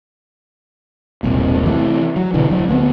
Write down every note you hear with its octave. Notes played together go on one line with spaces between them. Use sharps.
E1 C2 A#2
C3 E3 G3 A3
F#3
B2 D3 E3
D1 F#3
D2 A#3 B3